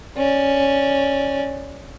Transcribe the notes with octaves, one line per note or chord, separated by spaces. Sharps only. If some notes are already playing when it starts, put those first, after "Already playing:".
C#4 D5